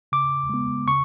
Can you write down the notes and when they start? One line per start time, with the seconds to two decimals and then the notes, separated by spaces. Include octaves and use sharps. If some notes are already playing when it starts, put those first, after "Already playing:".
0.12 C#3 D6
0.49 G#3 B3
0.88 C#3 C#6